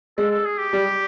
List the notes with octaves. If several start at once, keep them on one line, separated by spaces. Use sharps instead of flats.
G#3 A4
A4
G#4
G4
G3